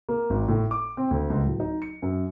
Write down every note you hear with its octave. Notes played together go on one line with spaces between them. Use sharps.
A#3
G#1
A2
D6
C4
D2
C#2
D1
D#4
C#7
F#2